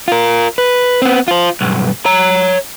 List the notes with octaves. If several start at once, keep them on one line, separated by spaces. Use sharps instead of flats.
F4 A#4
B4
B3 C4
F4 C5
B1 G2
C#5 A#5